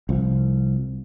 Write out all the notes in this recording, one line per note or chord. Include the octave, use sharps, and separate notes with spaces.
C2 F3